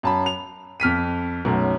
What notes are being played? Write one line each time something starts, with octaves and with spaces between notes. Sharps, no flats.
F#2 A5 B5
F7
F2 F6 B6 D#7
B1 F#2 A3